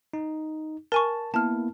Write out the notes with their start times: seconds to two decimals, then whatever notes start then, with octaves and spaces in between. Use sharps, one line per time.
0.14 D#4
0.92 A#4 G#5 A5 C#6
1.34 A#3 B3 E4 A5 F6